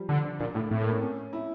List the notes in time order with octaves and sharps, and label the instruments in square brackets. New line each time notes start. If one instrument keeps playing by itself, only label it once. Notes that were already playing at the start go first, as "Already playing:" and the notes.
Already playing: [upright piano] F3 G3
[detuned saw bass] D3 [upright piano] D4
[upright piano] D4
[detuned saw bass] A#2 [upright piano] D4
[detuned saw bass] A2
[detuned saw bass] A2 [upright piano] A3
[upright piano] A#3
C#4
C#4
E4